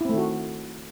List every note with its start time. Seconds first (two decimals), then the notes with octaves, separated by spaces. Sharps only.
0.01 E4
0.05 C4
0.09 A3
0.14 D#3
0.18 F#4